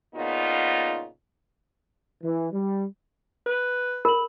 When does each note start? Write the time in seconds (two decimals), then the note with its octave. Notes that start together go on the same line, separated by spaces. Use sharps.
0.15 A#2 C#3 B3 D#4 F4
2.23 E3
2.52 G3
3.46 B4
4.05 A#4 B5 F#7